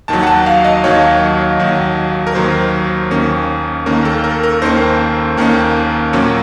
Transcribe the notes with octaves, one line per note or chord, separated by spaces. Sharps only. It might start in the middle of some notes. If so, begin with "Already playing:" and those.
D#2 D#3 F#3 A5
F#5
A5
F5
D#5
D#2 D#3 F#3 C#5
D#2 D#3 F#3
A#4
D#2 D#3 F#3 C5
D#2 D#3 A#3 C#4
D#2 D#3 A#3 C#4 A#4
A4
A#4
A#4
D#2 D#3 A#3 C#4 C5
D#2 D#3 A#3 C#4
A#2 F#3 A#3 C#4